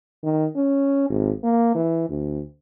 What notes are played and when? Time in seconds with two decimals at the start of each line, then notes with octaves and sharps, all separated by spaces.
0.24 D#3
0.56 C#4
1.10 G#1
1.44 A#3
1.75 E3
2.10 D2